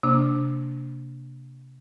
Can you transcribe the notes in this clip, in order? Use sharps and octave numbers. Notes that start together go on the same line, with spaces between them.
C3 A#3 D4